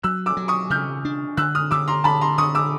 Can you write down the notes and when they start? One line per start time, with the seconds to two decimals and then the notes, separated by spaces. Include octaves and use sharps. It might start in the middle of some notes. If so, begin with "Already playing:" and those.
0.03 F#3 E6 F#6
0.26 D6 E6
0.37 F#3
0.48 C#6 D#6
0.70 C#3 F6 G6
1.05 D4
1.37 D3 E6 F#6
1.55 D#6 F6
1.71 D3 D6 E6
1.88 A#5 C6
2.04 D3 A5 B5
2.21 A#5 C6
2.38 D3 C#6 D#6
2.55 D6 E6